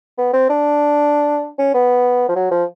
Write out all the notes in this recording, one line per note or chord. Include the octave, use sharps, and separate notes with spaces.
B3
C4
D4
C#4
B3
F3
F#3
F3